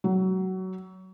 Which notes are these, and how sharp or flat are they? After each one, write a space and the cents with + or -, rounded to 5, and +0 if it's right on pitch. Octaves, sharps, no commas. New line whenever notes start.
F#3 +20